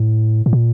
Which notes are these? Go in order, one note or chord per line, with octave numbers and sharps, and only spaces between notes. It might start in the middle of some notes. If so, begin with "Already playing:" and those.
Already playing: A2
A2
A#2